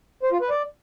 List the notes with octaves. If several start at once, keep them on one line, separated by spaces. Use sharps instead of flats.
C5
F4
B4
D5